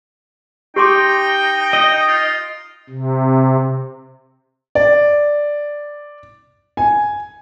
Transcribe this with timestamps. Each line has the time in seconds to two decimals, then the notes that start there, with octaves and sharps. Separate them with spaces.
0.76 D#4 G4 G5 C6 D6
1.73 D#5
2.08 F4
2.90 C3
4.75 D5
6.77 G#5